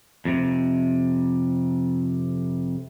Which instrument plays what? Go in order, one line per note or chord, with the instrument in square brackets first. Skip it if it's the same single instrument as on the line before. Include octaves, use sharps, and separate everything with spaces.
[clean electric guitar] F2 C3